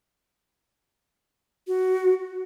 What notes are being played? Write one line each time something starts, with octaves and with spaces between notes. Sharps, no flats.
F#4